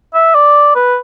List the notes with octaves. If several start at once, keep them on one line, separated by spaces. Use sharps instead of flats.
E5
D5
B4